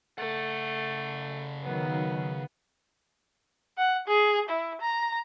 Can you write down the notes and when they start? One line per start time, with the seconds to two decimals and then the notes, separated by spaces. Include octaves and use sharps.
0.18 C#3 A3 F#5
1.63 D#3 F#3 B3
3.78 F#5
4.07 G#4
4.49 E4
4.81 A#5